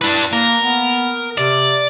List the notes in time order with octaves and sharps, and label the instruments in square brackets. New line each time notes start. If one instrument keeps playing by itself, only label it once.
[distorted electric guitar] D4 B4 [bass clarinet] E4
[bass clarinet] A#3 [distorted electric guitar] A#4
[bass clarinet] B3
[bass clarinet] C3 [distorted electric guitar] D5